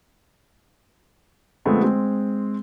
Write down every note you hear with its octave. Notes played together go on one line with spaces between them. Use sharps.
D3 F3 G#3 A3 B3 C4
G#3 C4